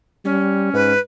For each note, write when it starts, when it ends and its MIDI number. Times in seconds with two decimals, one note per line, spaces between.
0.25 0.70 55
0.25 0.93 61
0.74 0.94 44
0.74 1.00 71